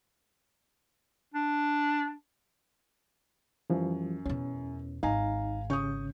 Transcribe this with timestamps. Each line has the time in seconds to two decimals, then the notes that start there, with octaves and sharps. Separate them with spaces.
1.34 D4
3.70 F#2 E3 F3 G3
4.26 E2 B2 C#4
5.03 G#1 D#4 F5 G#5 A#5
5.70 C#3 C#4 C#6 D#6 G6